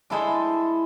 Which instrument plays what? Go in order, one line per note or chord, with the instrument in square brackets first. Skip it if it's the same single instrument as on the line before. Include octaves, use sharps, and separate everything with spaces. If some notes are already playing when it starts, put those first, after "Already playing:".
[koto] G#3 D4 A4 C5 [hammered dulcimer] E4